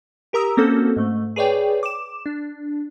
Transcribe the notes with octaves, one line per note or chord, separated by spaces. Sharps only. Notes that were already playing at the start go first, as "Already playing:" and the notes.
G4 A#4 A#5 D#6 E6
A#3 C4 C#4 F#4 A4
G#2 A3
G#4 B4 C#5 D5 G5
D6 E7
D4